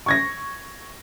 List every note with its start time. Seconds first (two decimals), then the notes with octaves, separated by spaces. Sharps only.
0.06 C#6 G#6 A#6